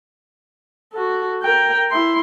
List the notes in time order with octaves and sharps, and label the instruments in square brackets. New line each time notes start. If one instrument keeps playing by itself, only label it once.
[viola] F#4 A4
A#4 G5
E4 C6